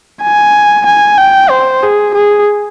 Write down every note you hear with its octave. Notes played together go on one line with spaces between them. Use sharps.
G#5
G#5
G5
C5
G#4
G#4